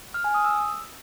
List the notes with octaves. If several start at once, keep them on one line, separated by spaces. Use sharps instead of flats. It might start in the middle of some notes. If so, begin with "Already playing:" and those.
F6
G#5
D#6
E6